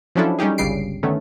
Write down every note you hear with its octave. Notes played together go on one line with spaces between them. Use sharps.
F3 F#3 C#4 D4 E4 A4
G3 C#4 D#4 G4 G#4
G1 C#2 C#3 G3 C7 D7
D3 D#3 A3 B3 C#4